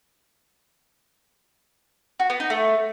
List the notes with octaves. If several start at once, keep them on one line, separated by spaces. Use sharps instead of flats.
F#4
B3
D#4
A3